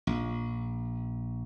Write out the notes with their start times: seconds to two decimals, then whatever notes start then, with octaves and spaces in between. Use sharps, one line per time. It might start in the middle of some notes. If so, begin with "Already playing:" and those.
0.07 A#1